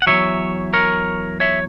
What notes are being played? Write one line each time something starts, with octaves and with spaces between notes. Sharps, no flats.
F#5
E2 D#3 F#3 C#5 E5
A#4 C#5
C#5 E5